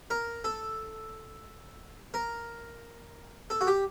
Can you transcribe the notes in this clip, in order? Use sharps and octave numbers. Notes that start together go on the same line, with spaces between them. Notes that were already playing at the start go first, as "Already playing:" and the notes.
A#4
A4
A#4
A4
F#4
G4